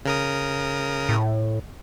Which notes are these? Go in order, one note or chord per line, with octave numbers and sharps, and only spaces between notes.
C#3 A#4 D#6
A2